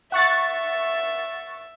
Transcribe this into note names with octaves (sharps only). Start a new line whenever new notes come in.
E5 F#5 C#6 A6